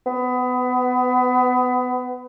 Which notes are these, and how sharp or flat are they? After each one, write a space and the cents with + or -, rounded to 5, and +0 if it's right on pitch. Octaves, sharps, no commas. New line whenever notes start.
B3 +25